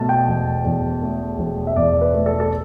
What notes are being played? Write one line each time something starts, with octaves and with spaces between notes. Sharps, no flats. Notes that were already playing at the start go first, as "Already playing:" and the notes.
Already playing: B2 A3 A5
G5
E1
E2
A3
E1
E5
E2 D5
B4
A3
A4
A4